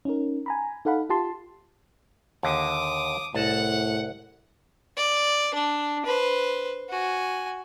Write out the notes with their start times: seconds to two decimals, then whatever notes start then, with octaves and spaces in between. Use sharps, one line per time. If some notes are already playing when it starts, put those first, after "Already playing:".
0.05 C#4 D#4 A#4
0.46 G#5 A#5 B5
0.85 D#4 A4 F5 F#5 B5
1.10 F4 G4 A5 C6
2.43 D#2 D3 D6 D#6
3.34 C2 A2 F#5 A5
4.97 D5
5.54 D4
6.06 B4 C5
6.89 F#4 G#5